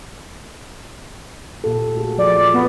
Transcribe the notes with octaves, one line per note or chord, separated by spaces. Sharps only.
A#2 G4 A4
A3 F#4 G#4
F3 D5
B3